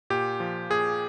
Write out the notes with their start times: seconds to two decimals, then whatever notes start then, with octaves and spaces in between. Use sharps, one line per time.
0.10 A#2 G4
0.40 F3
0.70 A#2 G#4